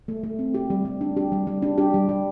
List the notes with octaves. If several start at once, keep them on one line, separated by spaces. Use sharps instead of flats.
A3
A3
C4
G4
G3
G3
D4
G4
G3
G3
D4
G4
G3
G3